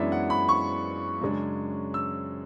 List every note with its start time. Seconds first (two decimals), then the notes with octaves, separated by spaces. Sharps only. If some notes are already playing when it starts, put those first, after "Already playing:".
Already playing: F#2 E3 G#3 B3 D4 D5 E5
0.12 F#5
0.30 B5
0.49 C#6
1.21 F#2 C#3 G#3 D4
1.94 E6